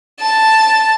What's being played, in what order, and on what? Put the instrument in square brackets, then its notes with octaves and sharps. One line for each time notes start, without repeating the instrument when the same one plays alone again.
[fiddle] A5